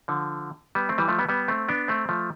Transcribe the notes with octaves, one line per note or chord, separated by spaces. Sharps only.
D3 F3
G3 B3
A3 C4
E3 G3
F3 A3
G3 B3
G3 B3
A3 C4
B3 D4
A3 C4
F3 A3